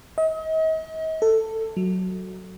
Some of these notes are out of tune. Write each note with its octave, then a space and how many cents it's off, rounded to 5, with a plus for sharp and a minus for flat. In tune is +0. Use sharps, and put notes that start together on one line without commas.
D#5 +40
A4 +15
F#3 +5